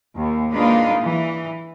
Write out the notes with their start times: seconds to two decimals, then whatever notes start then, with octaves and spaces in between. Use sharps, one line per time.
0.16 D#2
0.52 G#3 A#3 D4 D#4 F4 B4
1.01 E3